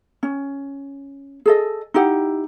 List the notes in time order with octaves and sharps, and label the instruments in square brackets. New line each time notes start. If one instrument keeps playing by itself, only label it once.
[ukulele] C#4
G#4 A4 D#5
D#4 E4 G4 F#5